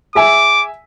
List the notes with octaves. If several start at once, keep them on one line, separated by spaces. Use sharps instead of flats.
G#4 E5 G#5 D6